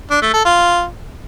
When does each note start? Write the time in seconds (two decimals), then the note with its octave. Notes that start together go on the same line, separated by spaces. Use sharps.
0.11 D4
0.22 A3
0.34 A4
0.45 F4